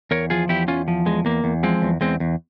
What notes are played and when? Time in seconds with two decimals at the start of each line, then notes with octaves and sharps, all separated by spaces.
0.11 E2 A#4 C#5
0.30 F3 F4 G#4
0.49 E2 E4 G4
0.68 E2 C#4 F4
0.88 F3
1.06 E2 G#3
1.25 E2 A#3
1.44 E2
1.63 F3 G#3 C4
1.82 E2
2.01 E2 G#3 C4
2.20 E2